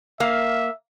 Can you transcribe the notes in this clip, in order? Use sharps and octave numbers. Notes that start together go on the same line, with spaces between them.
A#3 E5 F5